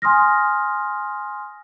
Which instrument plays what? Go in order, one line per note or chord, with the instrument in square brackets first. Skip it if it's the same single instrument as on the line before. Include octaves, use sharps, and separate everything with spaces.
[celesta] G#5 C6 D#6 F6 A#6